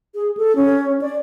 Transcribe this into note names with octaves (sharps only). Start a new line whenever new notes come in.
G#4
A4
C#4
D5